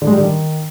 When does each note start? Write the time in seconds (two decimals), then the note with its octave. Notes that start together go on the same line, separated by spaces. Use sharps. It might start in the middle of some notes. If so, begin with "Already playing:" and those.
0.02 D3
0.07 G#3
0.12 G3
0.18 D3
0.23 D#3